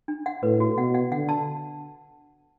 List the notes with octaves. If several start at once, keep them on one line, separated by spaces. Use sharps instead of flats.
D4
F#5
A2 B4
F#4
B2 F#5
F#5
D3 F#5
A5